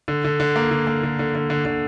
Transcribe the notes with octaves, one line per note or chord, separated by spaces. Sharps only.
D3
D3
D3
A#3
D3
A#3
D3
D3
D3
D3
D3